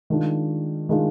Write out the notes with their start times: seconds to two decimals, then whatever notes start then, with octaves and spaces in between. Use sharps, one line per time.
0.10 D#3 G#3 D4 F4
0.89 D#3 G#3 D4 F4